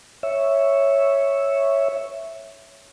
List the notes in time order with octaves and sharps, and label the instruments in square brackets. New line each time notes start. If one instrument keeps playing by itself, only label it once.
[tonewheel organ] C#5 E5